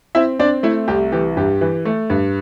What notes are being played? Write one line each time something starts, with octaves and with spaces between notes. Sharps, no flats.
C4 E4 E5
C4 D4 D5
A3 E4
C2 G4
E3 G4
G2 G4
E3
A3
G2